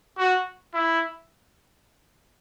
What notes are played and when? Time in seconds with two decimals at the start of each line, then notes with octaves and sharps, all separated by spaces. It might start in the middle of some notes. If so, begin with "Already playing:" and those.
0.18 F#4
0.74 E4